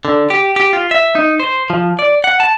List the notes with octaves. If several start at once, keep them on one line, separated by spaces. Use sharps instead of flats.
D3
G4
G4
F4
E5
D#4
C5
F3
D5
F#5
A5